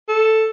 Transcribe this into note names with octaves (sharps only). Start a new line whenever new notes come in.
A4